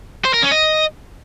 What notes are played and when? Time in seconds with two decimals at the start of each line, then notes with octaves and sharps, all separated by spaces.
0.25 C5
0.34 A#4
0.43 C#4
0.51 D#5